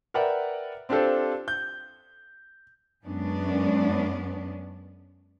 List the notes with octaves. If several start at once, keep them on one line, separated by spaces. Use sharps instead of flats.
A#4 B4 D5 E5 F#5 G5
C4 D4 F4 G4 A4 C5
G6
F#2 G#3 B3 C#4 D4